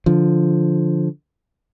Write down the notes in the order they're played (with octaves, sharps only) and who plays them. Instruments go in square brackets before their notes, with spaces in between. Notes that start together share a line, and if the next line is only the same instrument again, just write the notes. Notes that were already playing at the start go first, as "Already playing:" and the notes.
[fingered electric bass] D3 F3